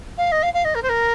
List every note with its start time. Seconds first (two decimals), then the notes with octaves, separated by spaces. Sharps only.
0.17 F5
0.31 D#5
0.42 F5
0.53 F5
0.64 D#5
0.74 A#4
0.82 C5
0.89 A#4